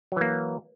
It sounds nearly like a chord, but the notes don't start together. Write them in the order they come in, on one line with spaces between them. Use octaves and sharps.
F#3 E3 A#3